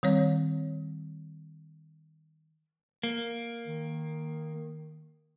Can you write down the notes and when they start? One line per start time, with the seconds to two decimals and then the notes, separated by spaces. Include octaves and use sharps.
0.03 D#3 G3 C4 C#5
3.03 A#3
3.67 D#3